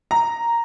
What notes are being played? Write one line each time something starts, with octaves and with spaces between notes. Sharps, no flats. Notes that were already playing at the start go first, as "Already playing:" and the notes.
A#5